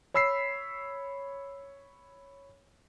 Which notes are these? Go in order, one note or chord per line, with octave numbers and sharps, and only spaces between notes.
C#5 B5 E6 B6 C7